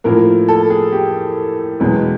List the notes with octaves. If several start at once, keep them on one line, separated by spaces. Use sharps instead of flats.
A2 F3 A#3 A#4
A4
G#4
G4
E2 B2 G#3 C#4